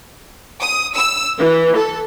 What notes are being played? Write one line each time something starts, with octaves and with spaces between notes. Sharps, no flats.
D#6
E6
E3
A4